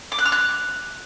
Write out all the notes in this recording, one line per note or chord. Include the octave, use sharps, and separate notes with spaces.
D6
F#6
F6
F#6